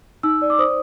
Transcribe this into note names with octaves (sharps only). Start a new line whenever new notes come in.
D#4 E6
D5
D6
C5 D#6